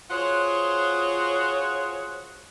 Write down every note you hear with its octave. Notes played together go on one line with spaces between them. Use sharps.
F4 F#4 G#4 C5 C#5 F#5